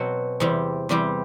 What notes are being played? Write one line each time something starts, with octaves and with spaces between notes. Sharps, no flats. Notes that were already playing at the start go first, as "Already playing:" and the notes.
Already playing: B2 F#3 C4 F#4
E2 C3 G3 C4 G4
E2 C3 G3 C4 G4